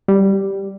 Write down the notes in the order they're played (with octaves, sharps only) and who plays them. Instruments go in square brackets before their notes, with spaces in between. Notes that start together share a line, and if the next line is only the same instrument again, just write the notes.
[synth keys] G3